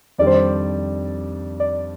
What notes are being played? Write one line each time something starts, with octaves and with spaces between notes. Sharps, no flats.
F2 D#3 G3 D4 D5
C5
D5
D5